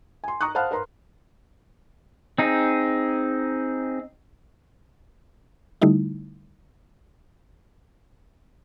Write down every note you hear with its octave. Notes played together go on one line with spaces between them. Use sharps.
G#5 C6
A#5 C#6 D#6 F#6
C5 F5 F#5 A5 B5 F6
A#4 B4 A#5 C6
C4 D#4 G#4
D3 G3 A3 D#4 E4